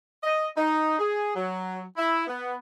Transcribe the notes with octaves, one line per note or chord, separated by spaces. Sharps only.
D#5
D#4
G#4
F#3
E4
B3